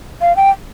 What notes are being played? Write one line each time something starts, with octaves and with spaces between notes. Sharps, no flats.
F5
G5